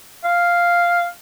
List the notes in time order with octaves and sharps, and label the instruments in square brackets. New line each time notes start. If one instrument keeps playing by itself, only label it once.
[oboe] F5